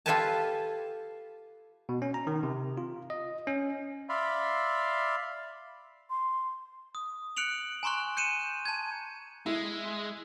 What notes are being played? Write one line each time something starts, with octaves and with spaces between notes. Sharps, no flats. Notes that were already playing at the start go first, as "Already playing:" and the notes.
F4 G4 A4 B4 G#5 A5
B2
C#4
A#5
D#3
C3
F4
D#5
C#4
D5 E5 F5 B5 C6
C6
D#6
F#6 C#7 D7 F7 F#7
G#5 A#5 C6 C#6 F#6
G6 C#7 D#7 E7
A5 G#6
G#3 E4